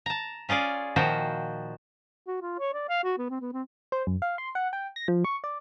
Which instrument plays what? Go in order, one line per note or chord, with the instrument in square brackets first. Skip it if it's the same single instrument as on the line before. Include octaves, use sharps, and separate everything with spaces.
[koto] A5 A#5
C#4 F4 G#4 D5
A#2 D#3 F3 F#4 C5 G5
[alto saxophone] F#4
F4
C#5
D5
F5
F#4
B3
C4
B3
C4
[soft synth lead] C5
F#2
F5
C6
F#5
G5
A#6
F3
C#6
D5